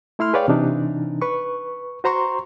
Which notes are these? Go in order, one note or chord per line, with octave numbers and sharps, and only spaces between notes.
A3 E4 C6 F6
G#4 B4 C#5 D5 F5 G5
C3 E3 D4 D#4
B4 C#6
F#4 C5 A#5 C6 C#6